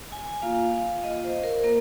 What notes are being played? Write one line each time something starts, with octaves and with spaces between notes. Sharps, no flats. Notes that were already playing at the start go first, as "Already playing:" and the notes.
G#5
A#3 F4 F5
A#3 F4 D#5
C5
A#4
A#3 A#4